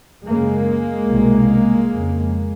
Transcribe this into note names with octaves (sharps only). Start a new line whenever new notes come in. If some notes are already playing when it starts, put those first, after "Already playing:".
F#2 C#3 G#3 A#3
C2 B2
F2 C#3